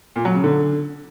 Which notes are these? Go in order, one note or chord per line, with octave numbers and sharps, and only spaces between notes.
A#2
F#3
C#3
D3